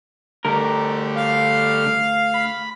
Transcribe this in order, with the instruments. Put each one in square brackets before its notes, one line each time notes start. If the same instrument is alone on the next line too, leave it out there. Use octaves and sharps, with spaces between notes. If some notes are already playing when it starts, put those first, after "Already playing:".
[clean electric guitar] D2 A#4 [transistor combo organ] D3 G3 A3
[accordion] F5
[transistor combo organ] B5